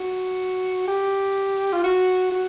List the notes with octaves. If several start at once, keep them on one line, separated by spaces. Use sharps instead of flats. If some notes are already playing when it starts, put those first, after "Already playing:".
Already playing: F#4
G4
F4
F#4
F#4